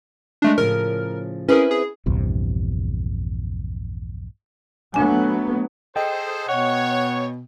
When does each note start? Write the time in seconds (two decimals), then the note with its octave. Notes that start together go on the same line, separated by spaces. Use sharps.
0.42 G#3 A3 D4
0.58 A2 C#3 F3 A#4
1.48 C4 C#4 E4 G#4 A#4 B4
1.71 G#4
2.06 A#1 E2 G2 C3
4.94 F#3 A3 B3 D4 G#5
5.96 G#4 A4 C5 D#5 G5
6.49 B2 C#5 F#5